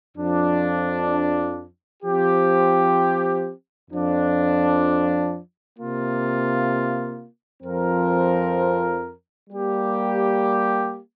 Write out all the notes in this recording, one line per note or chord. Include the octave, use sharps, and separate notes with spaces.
F2 F3 D4
F3 C4 G4
F2 F3 D4
C3 A#3 F4
F2 F3 C4 A#4
G3 A#3 G4